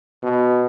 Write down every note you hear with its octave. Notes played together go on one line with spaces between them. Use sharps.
B2